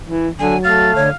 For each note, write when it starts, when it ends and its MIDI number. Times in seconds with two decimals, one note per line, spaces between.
0.07 0.29 52
0.39 0.55 50
0.39 0.95 54
0.39 0.57 80
0.64 1.06 57
0.64 1.16 77
0.64 0.94 93
0.95 1.10 50
0.95 1.09 73